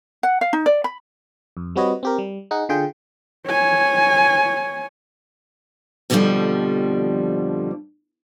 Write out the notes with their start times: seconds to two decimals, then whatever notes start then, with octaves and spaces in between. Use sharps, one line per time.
0.23 F#5
0.41 F5
0.53 D#4
0.66 D5
0.84 B5
1.57 F2
1.76 G3 C4 F#4 B4 C#5 D#5
2.03 C4 G4 A#4
2.18 G3
2.51 D#4 G#4 F#5
2.69 D3 F4 G#4 G5
3.47 C#5 G#5
6.10 F2 B2 D3 D#3 F3 G3